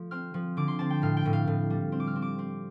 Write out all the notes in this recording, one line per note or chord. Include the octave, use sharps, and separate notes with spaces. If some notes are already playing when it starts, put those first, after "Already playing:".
Already playing: F3 A3
C4 F6
F3
D3 D6
C6
C4 A5
G5
A2 F5
G5
A2
F5
A2
G3
C4
D6
F6
C4
D6
C4